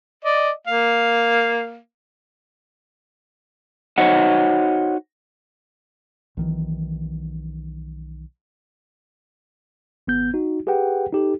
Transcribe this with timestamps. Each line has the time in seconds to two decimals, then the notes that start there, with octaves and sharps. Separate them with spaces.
0.24 D5 D#5
0.67 A#3 F5
3.98 D#4 F#4 C5 C#5 D#5 F#5
6.37 B1 D#3 E3
10.07 G#1 B3 G6
10.34 D#4 F#4
10.67 G4 G#4 B4 F#5 G5
11.12 D#4 G4 A4